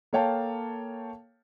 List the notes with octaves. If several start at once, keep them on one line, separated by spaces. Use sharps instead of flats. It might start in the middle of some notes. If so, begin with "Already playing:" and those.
A#3 A4 C#5 F5 G5 A5